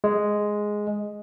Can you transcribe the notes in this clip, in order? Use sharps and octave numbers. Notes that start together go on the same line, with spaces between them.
G#3